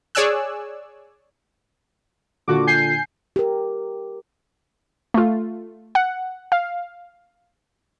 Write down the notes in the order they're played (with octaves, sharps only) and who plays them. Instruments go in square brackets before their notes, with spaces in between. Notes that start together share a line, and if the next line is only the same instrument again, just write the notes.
[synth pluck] G#4 C#5 D5 G#5 E6 F#6
[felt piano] A#2 D3 [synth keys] F4 F#4 D6
[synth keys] G#5 G6 C7
[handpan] G4 A#4
[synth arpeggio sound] A3 F4
F#5
F5